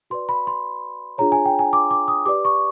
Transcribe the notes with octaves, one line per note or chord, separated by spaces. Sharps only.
F#4 B4 D5 C6
B5
C6
D4 F4 G#4 C#5 A#5
G#5
G5
G#5
D6
D6
D#6
G4 B4 D5 D6
C#6